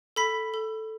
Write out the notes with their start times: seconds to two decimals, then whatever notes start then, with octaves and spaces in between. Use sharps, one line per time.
0.16 A4 B5 B6
0.54 A4